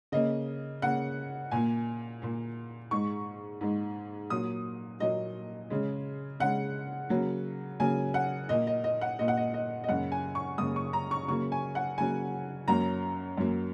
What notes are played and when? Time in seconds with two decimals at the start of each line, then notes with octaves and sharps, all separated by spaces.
0.12 C#3 A#3 D#5
0.82 C#3 A#3 F#5
1.51 A#2 A#3 G#5
2.22 A#2 A#3
2.91 G#2 G#3 C#6
3.61 G#2 G#3
4.30 A#2 F#3 A#3 D#6
5.00 A#2 F#3 A#3 D#5
5.70 C#3 G#3
6.40 C#3 G#3 F#5
7.09 C#3 F#3 A#3
7.80 C#3 F#3 A#3 G#5
8.14 F#5
8.49 A#2 A#3 D#5
8.67 D#5
8.84 D#5
9.01 F#5
9.19 A#2 A#3 D#5
9.28 F#5
9.37 D#5
9.54 D#5
9.84 D#5
9.89 F#2 C#3 A#3 F#5
10.12 G#5
10.35 C#6
10.58 F#2 C#3 A#3 D#6
10.76 C#6
10.93 A#5
11.11 C#6
11.28 C#3 F#3 A#3 C#6
11.52 G#5
11.75 F#5
11.98 C#3 F#3 A#3 G#5
12.68 F#2 F#3 A#3 A#5
13.38 F#2 F#3 A#3